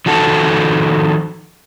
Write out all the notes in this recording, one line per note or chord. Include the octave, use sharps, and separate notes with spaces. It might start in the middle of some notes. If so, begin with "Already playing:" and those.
D#3 F3 F#4 A4